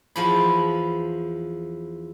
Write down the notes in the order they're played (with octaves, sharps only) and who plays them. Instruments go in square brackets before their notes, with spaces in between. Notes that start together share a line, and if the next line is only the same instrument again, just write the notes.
[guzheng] E2 F3 B5